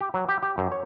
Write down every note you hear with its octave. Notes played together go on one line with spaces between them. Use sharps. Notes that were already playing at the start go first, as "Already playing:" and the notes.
G4
F#3
G4
G4
F#2
C#5